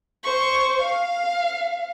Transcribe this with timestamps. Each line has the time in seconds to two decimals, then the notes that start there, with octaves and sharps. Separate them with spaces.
0.23 C5 C#6
0.82 F5